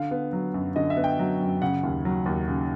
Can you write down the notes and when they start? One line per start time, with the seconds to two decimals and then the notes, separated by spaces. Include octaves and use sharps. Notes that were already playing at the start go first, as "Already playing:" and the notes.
Already playing: D3 F5
0.11 B3
0.33 F#3
0.54 F#2
0.76 D3 D#5
0.90 E5
0.97 B3
1.04 G5
1.19 F#3
1.41 F#2
1.62 C#3 F#5
1.83 D#2
2.05 F#3
2.26 D#2
2.48 C#3